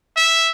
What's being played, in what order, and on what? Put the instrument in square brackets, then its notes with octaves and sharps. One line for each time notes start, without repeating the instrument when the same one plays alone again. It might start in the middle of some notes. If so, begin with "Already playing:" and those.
[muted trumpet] E5